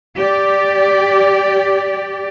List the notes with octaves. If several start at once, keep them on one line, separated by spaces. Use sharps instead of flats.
G4 D5